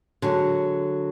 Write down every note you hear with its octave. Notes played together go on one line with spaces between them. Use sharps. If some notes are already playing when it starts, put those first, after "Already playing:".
D3 F#3 G#3